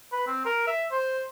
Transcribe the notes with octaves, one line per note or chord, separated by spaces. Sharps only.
B4
C4
A#4
E5
C5